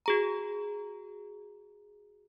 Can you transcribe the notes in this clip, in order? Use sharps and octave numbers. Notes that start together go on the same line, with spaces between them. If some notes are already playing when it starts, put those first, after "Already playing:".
F#4 G#4 A#5